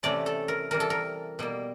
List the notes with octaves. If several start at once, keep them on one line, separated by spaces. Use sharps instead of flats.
C3 E3 A3 C#4 E4 D5
A4
A#4
C3 E3 G3 A#4
A4
A#4
B2 G3 A#3